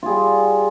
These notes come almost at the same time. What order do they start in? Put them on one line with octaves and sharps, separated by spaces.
F4 G#4 G3